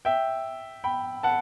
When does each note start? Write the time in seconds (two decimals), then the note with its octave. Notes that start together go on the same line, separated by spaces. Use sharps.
0.05 E5 G5
0.84 G5 B5
1.23 F#5 A5